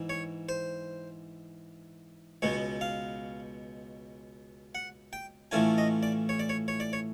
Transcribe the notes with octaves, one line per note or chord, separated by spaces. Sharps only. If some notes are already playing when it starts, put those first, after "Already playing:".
Already playing: G#2 E3 E4
C#5
C5
C#2 B2 G#3 B3 C#5
F5
F#5
G5
A2 E3 A3 C#4 F4 G#5
D#5
D5
C#5
D5
C#5
C#5
D5
C#5